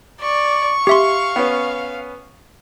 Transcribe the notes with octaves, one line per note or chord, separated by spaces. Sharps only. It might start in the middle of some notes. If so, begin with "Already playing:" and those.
D5 C#6
G4 E5 F5 C6
B3 C#4